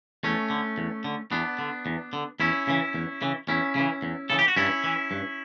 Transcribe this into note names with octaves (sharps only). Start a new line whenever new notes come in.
E2 A3 C#4
D3
E2
D3
E2 B3 D4
D3
E2
D3
E2 C#4 E4
C#3 E3
E2
C#3 E3
E2 C#4 E4
C#3 E3
E2
C#3 E3 A4
G4
F#4
G2 C#4 E4
E3
G2